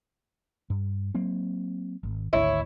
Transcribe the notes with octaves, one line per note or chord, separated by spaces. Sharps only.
G2
F#3 A#3 C4
G#1
G#1 D2 E4 C#5